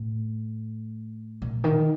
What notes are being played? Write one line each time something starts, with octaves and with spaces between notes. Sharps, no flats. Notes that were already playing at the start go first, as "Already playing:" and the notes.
Already playing: A2
A#2
D#3